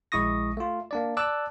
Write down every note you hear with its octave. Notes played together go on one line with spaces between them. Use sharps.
A#1 G#3 E4 C#6 D#6 A#6
A3 F4
A#3 D4 D5
D5 A5 D6 E6 F#6